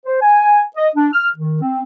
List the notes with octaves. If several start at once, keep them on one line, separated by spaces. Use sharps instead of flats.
C5
G#5
D#5
D4
F6
D#3
C4